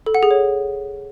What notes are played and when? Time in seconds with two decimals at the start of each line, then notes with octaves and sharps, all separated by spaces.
0.06 A4
0.15 F#5
0.23 G#4
0.31 C#5